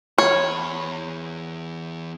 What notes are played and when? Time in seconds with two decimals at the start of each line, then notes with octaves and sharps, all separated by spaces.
0.18 E2 C#5 B5